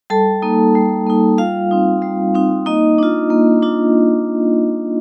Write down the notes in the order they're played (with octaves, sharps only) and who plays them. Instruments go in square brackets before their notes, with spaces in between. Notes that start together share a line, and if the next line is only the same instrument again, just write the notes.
[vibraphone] G3 A4 A5
A#3 D#4
G3
A#3 D#4
G3 F4 F5
C4 D#4
G3
C4 D#4
A#3 D#4 D#5
D4 F4
A#3
D4 F4